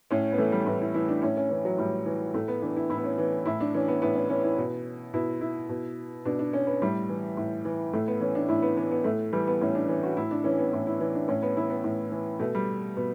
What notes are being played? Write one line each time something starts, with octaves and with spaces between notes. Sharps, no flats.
A2 C#4
B3
E3 A3
G3
A2 B3
E4
E3 E4
D4
A2 C#4
C#4
E3 C#4
F#3
A2 G3
E3
A2 A3
B3
E3 D4
E4
A2 E4
B3
C#4
E3
A2 E4
D4
E3 C#4
B3
A2 B3
C#4
E3 C#4
E4
B2
B2 E4
E4
B2
B2 D4
D4
C#4
B3
A2 G3
E3
A2
E3
A2 A3
B3
E3 C#4
D4
A2 E4
B3
E3 B3
B3
A2 A3
E3 G3
B3
A2 C#4
D4
E3
F#4
A2 E4
D4
E3 C#4
B3
A2
E4
E3 E4
D4
A2 C#4
B3
E3 E4
B3
A2
E3
B2 A3
G3
B2 B3